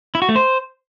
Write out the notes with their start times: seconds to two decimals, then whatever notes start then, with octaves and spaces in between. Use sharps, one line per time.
0.15 E4
0.22 F#4
0.29 A3
0.36 C5